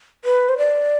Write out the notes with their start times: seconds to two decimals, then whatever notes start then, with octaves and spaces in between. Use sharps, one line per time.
0.25 B4
0.49 C5
0.58 D5